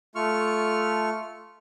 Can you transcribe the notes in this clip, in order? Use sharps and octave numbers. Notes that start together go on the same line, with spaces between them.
A3 F4 C#6 F6